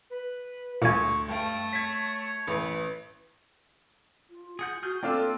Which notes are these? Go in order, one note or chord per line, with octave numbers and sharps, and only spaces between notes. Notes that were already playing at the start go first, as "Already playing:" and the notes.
B4
D2 A#2 G#5 C#6
G2 A3 G5
C#5 G#6 B6
A1 B4
F4
F4 G#4 F#5 G6
F#4 G#4 F6 G6
A#3 C4 D4 F4 A4 E6